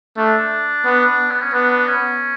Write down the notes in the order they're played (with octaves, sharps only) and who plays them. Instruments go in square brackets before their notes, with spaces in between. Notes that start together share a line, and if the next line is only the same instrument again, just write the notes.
[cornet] A3 [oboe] D4
[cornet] B3
[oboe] B3
C#4
[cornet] B3 [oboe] D4
[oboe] C#4